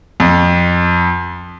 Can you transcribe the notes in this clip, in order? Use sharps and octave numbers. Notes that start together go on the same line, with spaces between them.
F2